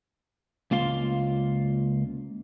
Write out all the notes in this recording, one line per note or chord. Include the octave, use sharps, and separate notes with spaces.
C#2 A#3 F4 F5 C6